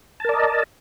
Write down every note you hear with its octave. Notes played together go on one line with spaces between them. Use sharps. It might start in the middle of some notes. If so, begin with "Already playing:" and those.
A#4 D5 D#5 A5